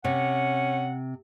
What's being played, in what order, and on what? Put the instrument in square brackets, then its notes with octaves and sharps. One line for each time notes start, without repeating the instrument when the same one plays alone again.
[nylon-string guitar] C3 [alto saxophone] C#4 [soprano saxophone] F#5